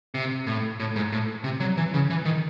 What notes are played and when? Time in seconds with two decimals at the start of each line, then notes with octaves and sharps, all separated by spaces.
0.14 C3
0.47 A2
0.80 A2
0.96 G#2
1.12 A2
1.44 C3
1.60 F#3
1.77 E3
1.94 C#3
2.10 E3
2.25 D#3